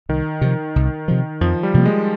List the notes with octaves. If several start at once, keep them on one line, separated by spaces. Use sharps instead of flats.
C2 D#3
C3 F3
C2
C3 F3
F2 F3
G3
C3 F3 A#3
G#3